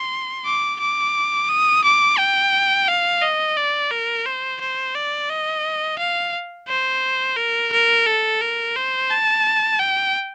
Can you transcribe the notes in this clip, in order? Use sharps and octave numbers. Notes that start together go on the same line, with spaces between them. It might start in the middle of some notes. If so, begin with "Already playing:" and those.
Already playing: C6
D6
D6
D#6
D6
G5
F5
D#5
D5
A#4
C5
C5
D5
D#5
F5
C5
A#4
A#4
A4
A#4
C5
A5
G5